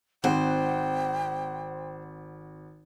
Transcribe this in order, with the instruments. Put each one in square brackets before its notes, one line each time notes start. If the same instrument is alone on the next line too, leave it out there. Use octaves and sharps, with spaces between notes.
[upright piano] G#1 C4 F#5 [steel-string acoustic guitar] C5 [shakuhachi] G5